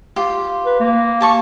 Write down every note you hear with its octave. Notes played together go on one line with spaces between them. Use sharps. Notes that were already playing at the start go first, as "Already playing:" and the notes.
F4 G4
B4
A#3
G4 A5 C#6